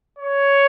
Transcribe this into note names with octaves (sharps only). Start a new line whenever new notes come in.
C#5